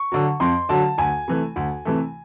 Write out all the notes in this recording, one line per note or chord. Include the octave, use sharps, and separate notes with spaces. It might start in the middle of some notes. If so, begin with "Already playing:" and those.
Already playing: C#6
D3 F#3
F2 C6
D3 F#3 A5
D2 G#5
C3 E3 A3
D2
C3 E3 A3